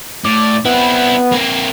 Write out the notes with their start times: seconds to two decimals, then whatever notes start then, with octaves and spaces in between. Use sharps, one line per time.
0.25 A2 D5
0.65 B3 C4 E4
1.32 A#3 C4